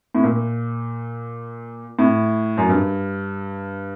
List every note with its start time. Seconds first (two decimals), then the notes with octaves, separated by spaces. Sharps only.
0.15 A2
0.23 A#2
1.99 A2
2.57 F#2
2.69 G2